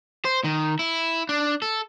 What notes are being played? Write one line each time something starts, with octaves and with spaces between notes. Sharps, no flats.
C5
D#3
E4
D4
A4